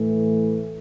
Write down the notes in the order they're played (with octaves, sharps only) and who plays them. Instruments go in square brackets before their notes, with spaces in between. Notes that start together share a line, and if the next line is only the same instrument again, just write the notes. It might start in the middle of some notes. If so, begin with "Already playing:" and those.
Already playing: [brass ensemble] A2 E3 A3